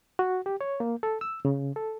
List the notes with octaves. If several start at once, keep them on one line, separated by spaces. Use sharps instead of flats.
F#4
G4
C#5
A#3
A4
E6
C#3
A4